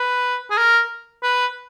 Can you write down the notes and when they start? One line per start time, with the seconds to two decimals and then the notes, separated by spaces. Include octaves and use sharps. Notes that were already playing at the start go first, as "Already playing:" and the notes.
Already playing: B4
0.50 G#4
0.58 A#4
1.23 B4